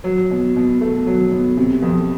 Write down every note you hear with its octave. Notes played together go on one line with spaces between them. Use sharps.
F#3
B2
B2
A3
F#3
B2
C3
F2